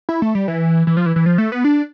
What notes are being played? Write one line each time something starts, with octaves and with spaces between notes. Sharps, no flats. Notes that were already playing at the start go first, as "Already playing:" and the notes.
E4
A3
G3
E3
E3
F3
E3
E3
F3
A3
B3
D4